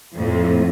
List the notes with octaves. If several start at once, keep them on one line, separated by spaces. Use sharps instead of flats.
F2 A2